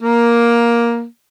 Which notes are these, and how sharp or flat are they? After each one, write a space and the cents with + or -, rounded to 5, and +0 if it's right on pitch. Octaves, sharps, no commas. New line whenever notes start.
A#3 +10